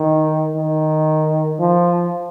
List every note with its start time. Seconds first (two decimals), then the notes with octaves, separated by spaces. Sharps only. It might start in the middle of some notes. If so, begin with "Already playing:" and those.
Already playing: D#3
0.56 D#3
1.60 F3